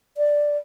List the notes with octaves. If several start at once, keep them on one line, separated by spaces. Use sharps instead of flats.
D5